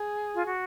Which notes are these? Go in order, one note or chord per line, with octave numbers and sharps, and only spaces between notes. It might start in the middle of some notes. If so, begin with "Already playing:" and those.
Already playing: G#4
F4
F#4